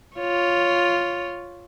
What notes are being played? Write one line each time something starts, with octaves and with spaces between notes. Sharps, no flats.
F4 C#5